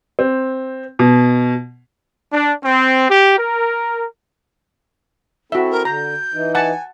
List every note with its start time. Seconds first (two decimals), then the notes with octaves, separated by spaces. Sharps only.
0.19 C4
0.99 B2
2.32 D4
2.63 C4
3.08 G4
3.37 A#4
5.52 C4 E4 F#4 A4 E5
5.71 A#4
5.85 D3 A#5 G6
6.34 E3 D#4
6.55 F#5 G#5 A5